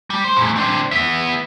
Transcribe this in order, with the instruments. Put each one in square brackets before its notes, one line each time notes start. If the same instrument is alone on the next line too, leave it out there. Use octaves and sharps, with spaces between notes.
[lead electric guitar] G3
C5
E2 A2
C4 D4
B3 E5